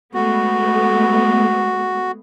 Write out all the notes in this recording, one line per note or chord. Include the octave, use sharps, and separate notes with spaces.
G#3 A3 B3 F#4